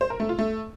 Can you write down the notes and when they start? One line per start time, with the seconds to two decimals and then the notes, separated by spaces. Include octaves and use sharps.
0.01 C5
0.10 A#4
0.20 A3
0.29 F4
0.39 A3